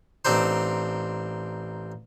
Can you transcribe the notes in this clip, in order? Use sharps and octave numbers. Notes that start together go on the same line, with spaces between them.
A1 C4 D4 D#4 C5